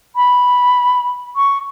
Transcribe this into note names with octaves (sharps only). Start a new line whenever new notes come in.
B5
C#6